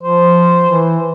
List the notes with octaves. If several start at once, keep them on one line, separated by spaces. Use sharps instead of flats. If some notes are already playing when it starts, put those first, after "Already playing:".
F3 C5
E3